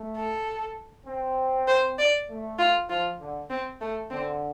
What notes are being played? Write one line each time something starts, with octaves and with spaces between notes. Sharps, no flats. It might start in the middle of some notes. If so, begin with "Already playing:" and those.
Already playing: A3
A4
C4
C5
D5
A3
F4
F3 F4
D3
C4
A3
D3 C4